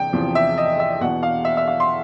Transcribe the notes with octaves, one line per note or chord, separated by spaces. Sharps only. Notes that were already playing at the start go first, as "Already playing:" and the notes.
Already playing: E2 C3 G5
E2 C3 F3
E5
D#5
E5
E2 B2 F#5
F5
E5
E5
F5
C6